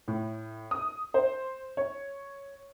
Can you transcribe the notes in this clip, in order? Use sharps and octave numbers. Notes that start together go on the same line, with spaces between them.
A2
D#6
C5
C#5